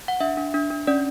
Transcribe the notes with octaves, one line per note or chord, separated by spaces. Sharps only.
F#5
D4 E5
D4
D4
D4
C#4 D5